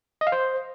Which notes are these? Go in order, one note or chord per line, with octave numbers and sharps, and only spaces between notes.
D#5
F5
C5